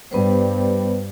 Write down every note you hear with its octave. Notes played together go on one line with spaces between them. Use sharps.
G2 G3 B3 B4 C5